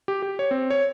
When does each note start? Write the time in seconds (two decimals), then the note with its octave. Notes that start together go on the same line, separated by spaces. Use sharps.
0.08 G4
0.22 G4
0.39 C#5
0.51 C4
0.70 C#5